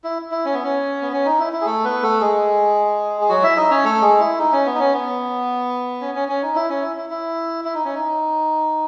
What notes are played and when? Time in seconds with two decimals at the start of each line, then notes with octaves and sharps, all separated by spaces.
0.04 E4
0.31 E4
0.45 C#4
0.54 B3
0.64 C#4
1.01 B3
1.13 C#4
1.25 D#4
1.39 E4
1.53 E4
1.61 G#4
1.66 A3 A4
1.84 B3 B4
2.03 A3 A4
2.20 G#3 G#4
3.21 G#4
3.29 F#3 F#4
3.43 E4 E5
3.57 D#4 D#5
3.71 C#4 C#5
3.85 A3 A4
4.02 G#3 G#4
4.20 E4
4.39 D#4
4.53 C#4
4.66 B3
4.75 D#4
4.79 C#4
4.93 B3
6.01 C#4
6.15 C#4
6.28 C#4
6.43 D#4
6.55 E4
6.69 C#4
6.83 E4
6.97 E4
7.10 E4
7.65 E4
7.74 D#4
7.85 C#4
7.95 D#4